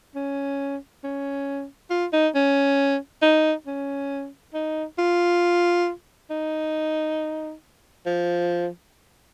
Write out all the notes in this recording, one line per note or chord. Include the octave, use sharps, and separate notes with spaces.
C#4
C#4
F4
D#4
C#4
D#4
C#4
D#4
F4
D#4
F3